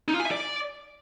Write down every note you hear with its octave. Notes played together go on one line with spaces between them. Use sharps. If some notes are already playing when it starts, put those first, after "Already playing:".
D#4
F4
G#5
E5
D5